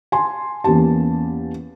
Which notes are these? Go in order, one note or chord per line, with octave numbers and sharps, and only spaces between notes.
G#5 A5 C6
E2 A#3 C#4 G4 A5